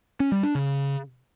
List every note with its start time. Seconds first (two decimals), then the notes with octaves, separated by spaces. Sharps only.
0.20 C#4
0.32 G3
0.43 D4
0.55 C#3